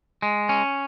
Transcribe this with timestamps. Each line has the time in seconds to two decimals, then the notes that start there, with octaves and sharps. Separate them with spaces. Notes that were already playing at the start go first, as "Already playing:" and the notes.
0.22 G#3
0.49 C#4